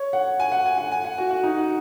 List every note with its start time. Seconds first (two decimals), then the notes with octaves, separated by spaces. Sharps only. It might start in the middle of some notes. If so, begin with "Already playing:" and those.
Already playing: C#5
0.13 F#5
0.40 G#5
0.52 F#5
0.66 G#5
0.78 F#5
0.92 G#5
1.04 F#5
1.18 F#4
1.31 F#4
1.43 D#4
1.57 F#4